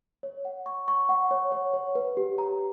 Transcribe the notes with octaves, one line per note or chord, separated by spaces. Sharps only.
C#5
F#5
C#6
C#6
F#5
C#5
C#5
C#5
B4
G4
A#5